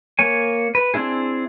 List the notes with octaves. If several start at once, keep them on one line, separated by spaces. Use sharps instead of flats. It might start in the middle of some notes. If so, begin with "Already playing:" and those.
A#3 C#5 G#5
B4
C4 D4 E4 G#4